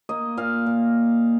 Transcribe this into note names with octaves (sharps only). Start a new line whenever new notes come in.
A#3 D#5
A#2 F5
A#2